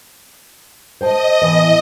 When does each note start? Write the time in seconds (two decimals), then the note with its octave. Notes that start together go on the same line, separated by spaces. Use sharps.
1.01 C5 D#5 G5 A5
1.42 A2 E3 B3